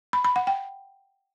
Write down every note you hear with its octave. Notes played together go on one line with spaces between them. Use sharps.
B5
B5
F#5
G5